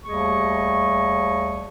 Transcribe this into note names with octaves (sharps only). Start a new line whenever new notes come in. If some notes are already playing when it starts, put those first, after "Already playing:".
D#2 G3 A3 G#4 D#5 C#6